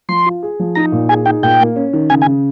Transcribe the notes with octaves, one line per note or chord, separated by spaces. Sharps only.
F3 C6
F4
G#4
F3
D#4 A#5
A#2
G#4 G#5
D#4 G5
A#2 G5
A#3
C#4
D#3
C#3 G#5
G#5
C#3